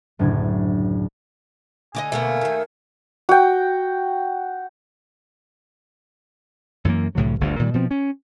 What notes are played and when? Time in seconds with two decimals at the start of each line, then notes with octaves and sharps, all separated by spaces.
0.19 F#1 D2 A2 D4 G#6
1.95 D3 D5 D#5 G#5
2.12 D2 B2 A3 A#3 A#4
2.41 D#2 D#3
3.29 F#4 G5
6.85 F#2 E3 F#3 A#3
7.15 C2 A2 D3 F#3
7.40 G1 D2 G2 D3
7.59 A#2 D#3 F#3 G3
7.74 B2 F3 C4
7.91 C#4